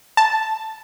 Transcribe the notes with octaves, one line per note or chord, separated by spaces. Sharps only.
A5